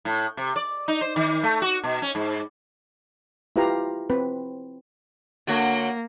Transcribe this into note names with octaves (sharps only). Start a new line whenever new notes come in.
A2
C3
D5
D#4
C5
D#3
A3
F#4
B2
C#4
G#2
E4 F4 G4 B4 F5 A#5
C4 B4
D3 A#3 F#4 C#5